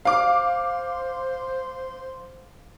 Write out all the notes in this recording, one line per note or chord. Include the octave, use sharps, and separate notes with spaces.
C5 F5 D6